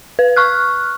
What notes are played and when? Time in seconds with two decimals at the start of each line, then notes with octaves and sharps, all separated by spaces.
0.19 B4
0.36 C#6 F6 F#6